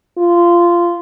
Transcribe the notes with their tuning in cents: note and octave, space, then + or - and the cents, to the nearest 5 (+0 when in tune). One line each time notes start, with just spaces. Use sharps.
F4 -15